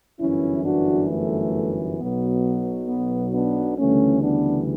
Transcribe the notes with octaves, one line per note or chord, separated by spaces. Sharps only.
G1 F#2 E3 C#4 E4
D4 F#4
A3
B1 B2 F#3 B3
B3
B3 D4
D2 C#3 E3 G3 A3 C#4
B3 D4